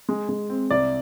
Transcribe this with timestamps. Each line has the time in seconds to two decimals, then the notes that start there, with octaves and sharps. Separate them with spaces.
0.09 G#3
0.29 G#3
0.50 C4
0.70 C2 D5